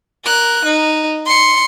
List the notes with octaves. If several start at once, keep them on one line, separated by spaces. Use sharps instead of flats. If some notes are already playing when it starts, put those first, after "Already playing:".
A#4 F#6
D#4
C6 C#7